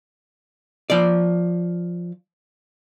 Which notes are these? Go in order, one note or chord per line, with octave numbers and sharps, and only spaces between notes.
F3 D5